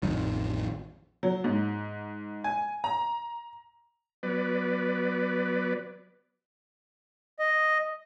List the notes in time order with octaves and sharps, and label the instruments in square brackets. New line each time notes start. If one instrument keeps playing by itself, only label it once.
[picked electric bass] A1 F2 D#3
[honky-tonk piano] F#3
G#2
G#5
A#5
[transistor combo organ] F#3 B3 B4 D5
[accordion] D#5